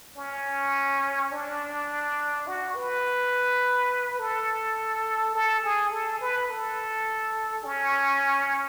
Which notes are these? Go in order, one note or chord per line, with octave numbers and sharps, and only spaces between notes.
C#4
D4
F#4
B4
A4
A4
G#4
A4
B4
A4
C#4